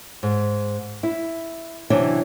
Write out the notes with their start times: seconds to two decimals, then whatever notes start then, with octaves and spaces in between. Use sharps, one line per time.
0.23 G#2
1.03 E4
1.90 C3 E3 F#3 C#4 D4 E4